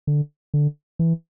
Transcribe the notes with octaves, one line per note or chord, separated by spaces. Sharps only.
D3
D3
E3